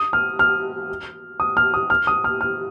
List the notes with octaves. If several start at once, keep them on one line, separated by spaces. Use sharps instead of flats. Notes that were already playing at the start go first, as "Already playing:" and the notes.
Already playing: D#6
F6
F6
D#6
F6
D#6
F6
D#6
F6
F6